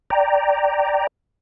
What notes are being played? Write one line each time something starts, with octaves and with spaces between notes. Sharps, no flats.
D5 G5 A#5